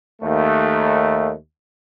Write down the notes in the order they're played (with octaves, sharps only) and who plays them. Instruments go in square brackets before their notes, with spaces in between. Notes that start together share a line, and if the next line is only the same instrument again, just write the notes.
[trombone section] D#2 A3